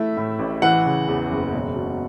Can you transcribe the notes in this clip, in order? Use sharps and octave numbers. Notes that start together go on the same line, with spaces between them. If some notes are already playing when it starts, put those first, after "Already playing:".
Already playing: A3 E4 E5
A2
A1
E3 F#5
C#3
E2
F#1
E1
B2